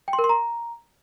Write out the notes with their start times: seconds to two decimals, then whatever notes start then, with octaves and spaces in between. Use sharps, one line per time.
0.08 G5
0.13 C6
0.19 A#4
0.24 C6
0.29 A#5